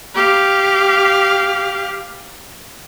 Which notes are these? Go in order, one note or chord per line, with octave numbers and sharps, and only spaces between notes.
G4 F5